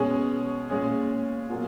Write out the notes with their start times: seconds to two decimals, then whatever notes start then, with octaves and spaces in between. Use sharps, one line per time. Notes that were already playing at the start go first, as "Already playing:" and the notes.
Already playing: B2 G#3 C#4 G#4
0.70 A#2 G#3 C#4 G#4
1.49 B2 F#3 A#3 F4 G#4